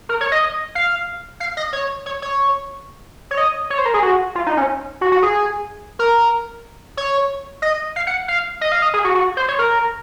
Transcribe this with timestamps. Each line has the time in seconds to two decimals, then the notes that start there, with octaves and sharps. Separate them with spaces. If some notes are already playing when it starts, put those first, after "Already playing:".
0.09 A#4
0.21 C#5
0.32 D#5
0.75 F5
1.40 F5
1.57 D#5
1.73 C#5
2.06 C#5
2.22 C#5
3.31 C#5
3.38 D#5
3.70 C#5
3.78 C5
3.86 A#4
3.94 G#4
4.02 F#4
4.35 F4
4.46 D#4
4.57 C#4
5.01 F#4
5.12 F#4
5.22 G#4
5.99 A#4
6.97 C#5
7.62 D#5
7.96 F5
8.07 F#5
8.28 F5
8.61 D#5
8.72 F5
8.82 D#5
8.94 G#4
9.04 F#4
9.15 F#4
9.37 C5
9.48 C#5
9.59 A#4